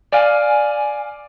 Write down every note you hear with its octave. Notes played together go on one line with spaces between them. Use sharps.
D5 F5 G#5